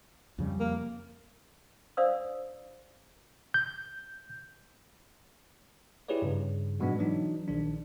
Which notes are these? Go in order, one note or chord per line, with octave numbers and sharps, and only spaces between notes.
F2 C#3 G3
A#3
D4 C5 D5 F5 D#6 E6
G6
E4 G4 G#4 B4 C#5 D5
G2 C#3
G#2 B2 F#3 G#3 B3 D4
E3 F#3 D4 D#4
A#1 D#3 D4